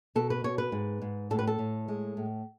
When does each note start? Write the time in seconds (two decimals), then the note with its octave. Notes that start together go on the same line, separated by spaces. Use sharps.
0.15 B2 A4
0.30 B4
0.44 B2 C#5
0.58 B4
0.72 G#2
1.02 G#2
1.30 A2 A4
1.39 B4
1.47 A4
1.59 A2
1.88 G#3
2.17 A2